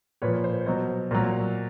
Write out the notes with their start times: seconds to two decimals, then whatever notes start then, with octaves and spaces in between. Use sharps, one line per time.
0.22 A#2 F3 B4 C#5
0.44 C5
0.66 B2 F#3 C5
1.11 A#2 F#3